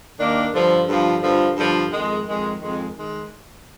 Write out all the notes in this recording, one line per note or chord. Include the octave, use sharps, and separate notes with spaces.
D#2 D#3 A#3 D4
G2 D3 F3
G2 D3 F3
G2 D3 F3
G2 D3 F3
F2 D#3 G#3
F2 D#3 G#3
F2 D#3 G#3
D#3 G#3